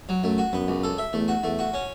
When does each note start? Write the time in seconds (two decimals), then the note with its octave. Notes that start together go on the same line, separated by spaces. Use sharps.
0.09 F#3
0.23 F#2 A3
0.38 F#4
0.53 F#2 B3
0.68 C#2
0.83 A4
0.98 E5
1.13 E2 A3
1.28 F#4
1.43 E2 A3
1.59 F#4
1.74 C#4